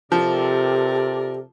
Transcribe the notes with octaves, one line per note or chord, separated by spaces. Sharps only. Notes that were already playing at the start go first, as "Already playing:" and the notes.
C3 F3 G4 A4 A#4 D5